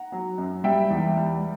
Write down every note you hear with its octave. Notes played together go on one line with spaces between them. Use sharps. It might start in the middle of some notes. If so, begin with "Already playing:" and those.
Already playing: F#5 A#5
F#3
F#2
G3 E5 G5
E2
G3